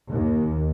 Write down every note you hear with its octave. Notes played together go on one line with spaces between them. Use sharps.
D#2